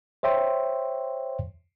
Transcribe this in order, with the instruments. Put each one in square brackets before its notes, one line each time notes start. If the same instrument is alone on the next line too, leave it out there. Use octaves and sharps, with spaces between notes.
[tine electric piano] C5 C#5 E5 G5 C6